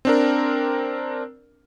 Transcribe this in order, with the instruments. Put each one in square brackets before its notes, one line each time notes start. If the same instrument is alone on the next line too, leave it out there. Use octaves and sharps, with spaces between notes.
[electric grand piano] C4 D4 A#4